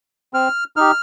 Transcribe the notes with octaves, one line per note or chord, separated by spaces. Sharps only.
C4 F6
D#4 G4 F6